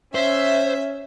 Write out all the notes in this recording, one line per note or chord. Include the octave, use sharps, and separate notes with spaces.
C#4 C5 E5